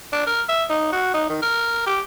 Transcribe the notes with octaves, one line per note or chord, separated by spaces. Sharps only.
D4
A#4
E5
D#4
F#4
D#4
D#3
A#4
G4